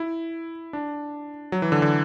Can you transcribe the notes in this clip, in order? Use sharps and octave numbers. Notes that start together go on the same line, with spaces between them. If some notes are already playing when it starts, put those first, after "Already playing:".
Already playing: E4
D4
F#3
E3
D3
D3